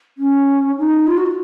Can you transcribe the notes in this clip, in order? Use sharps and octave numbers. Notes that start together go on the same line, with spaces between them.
C#4
D#4
F4
F#4